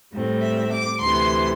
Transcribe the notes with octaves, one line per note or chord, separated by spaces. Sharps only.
A2 G3 C4
E5
D6
D2 C3 E3 C6